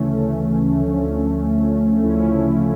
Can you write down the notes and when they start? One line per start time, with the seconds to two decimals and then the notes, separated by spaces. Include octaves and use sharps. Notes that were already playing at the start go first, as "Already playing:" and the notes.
Already playing: D2 C#3 E3 A3 C#4
0.80 D2 D3 F3
2.03 D2 C#3 F3 C#4 E4
2.34 C#4 E4
2.58 F4